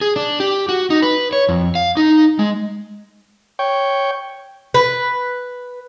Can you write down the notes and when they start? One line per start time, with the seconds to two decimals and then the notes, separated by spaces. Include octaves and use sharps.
0.01 G#4
0.16 D4
0.40 G4
0.69 F#4
0.90 D#4
1.02 B4
1.33 C#5
1.49 F2
1.75 F5
1.97 D#4
2.39 G#3
3.59 C#5 G5
4.74 B4